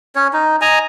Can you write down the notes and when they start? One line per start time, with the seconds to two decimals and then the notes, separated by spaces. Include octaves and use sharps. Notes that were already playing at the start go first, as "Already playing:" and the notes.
0.16 C#4 C#5
0.33 D#4
0.61 D#5 G#5 A#5